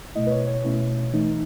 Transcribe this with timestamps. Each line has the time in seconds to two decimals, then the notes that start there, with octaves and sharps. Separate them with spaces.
0.15 B2 A3 E4 D#5
0.27 B4
0.31 C#5
0.47 C#5
0.64 B2 A3 C#4 E4
1.13 E3 A3 D#4